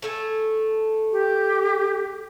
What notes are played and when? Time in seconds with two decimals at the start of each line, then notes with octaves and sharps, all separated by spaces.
0.02 A3 A4 G#5
1.12 G4